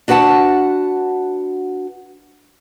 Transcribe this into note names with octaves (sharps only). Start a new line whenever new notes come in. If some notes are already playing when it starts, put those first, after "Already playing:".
D4 F#4 B4 F#5 A5